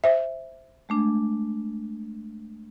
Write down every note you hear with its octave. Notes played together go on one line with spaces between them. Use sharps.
C5 E5
G#3 A3 D4